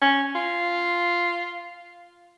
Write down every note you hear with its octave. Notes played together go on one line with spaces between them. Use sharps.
C#4
F4